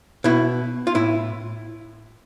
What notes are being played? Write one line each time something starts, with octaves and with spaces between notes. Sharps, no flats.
B2 E4
F4
A2 E4